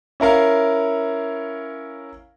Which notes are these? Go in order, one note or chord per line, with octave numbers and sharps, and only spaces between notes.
C#4 E4 A#4 F5